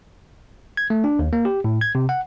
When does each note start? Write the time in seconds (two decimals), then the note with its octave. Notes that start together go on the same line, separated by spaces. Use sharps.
0.77 G#6
0.90 A3
1.04 D4
1.19 D#2
1.33 A#3
1.45 G4
1.64 A2
1.81 G#6
1.95 C3
2.09 F#5